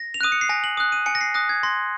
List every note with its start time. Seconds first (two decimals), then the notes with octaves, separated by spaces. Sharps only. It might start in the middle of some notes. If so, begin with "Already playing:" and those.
Already playing: A#6
0.14 F7
0.21 D#6 F#6 D#7
0.32 C#7
0.41 C7
0.49 G#5 A#6
0.64 F#7
0.77 D#6 F#6
0.92 D#7
1.06 G#5 C#7
1.15 A#6
1.21 C7
1.34 D#6 F#6 A#6
1.49 G#6
1.63 C6 A#6